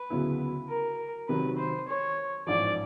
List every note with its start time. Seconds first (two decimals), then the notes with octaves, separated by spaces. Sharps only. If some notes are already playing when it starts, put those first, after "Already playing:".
Already playing: B4
0.10 D2 C#3 F#3 B3 E4
0.69 A#4
1.28 C3 D#3 F#3 B4
1.58 C5
1.88 C#5
2.47 A1 G#2 F3 D5